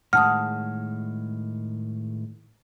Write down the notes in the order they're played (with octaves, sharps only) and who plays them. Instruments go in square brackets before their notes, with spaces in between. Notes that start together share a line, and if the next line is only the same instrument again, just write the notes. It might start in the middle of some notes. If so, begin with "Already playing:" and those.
[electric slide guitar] A2 D#3 G#3 [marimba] F#5 A5 D#6 [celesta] F6